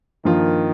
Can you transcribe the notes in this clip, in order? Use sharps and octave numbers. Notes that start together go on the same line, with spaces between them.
G2 D#3 F3 A#3 F4